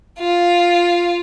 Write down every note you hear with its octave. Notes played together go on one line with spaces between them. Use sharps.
F4